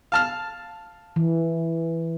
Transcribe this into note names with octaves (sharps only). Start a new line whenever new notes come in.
F5 A5 F6
E3